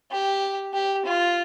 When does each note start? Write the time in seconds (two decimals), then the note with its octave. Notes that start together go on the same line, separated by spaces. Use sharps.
0.11 G4
0.74 G4
1.05 F4